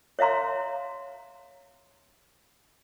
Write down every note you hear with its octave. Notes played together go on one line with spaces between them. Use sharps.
C#5 E5 F5 A#5 C6